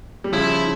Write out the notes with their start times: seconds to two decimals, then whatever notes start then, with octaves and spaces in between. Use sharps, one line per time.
0.24 G3
0.33 C#3 F3 E4